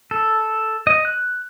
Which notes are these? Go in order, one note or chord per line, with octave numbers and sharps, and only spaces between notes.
A4
D#5
F#6